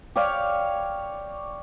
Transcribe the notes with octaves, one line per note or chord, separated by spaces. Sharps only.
G4 C#5 D5 F5